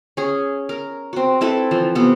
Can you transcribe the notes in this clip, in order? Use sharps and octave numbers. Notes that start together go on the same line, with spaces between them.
C#4 G#4
A#4
C4 F#4
C4 E4 A4 B4
E3 F3
C3 B3